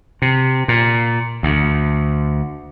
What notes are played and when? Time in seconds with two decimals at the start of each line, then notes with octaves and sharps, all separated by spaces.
0.22 C3
0.68 A#2
1.43 D2